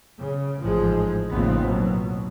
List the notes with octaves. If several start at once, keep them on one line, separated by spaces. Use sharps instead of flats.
C#3
A1 G#2 F3 G#3
A1 D#2 C#3 F3 B3 C4
B2 F#3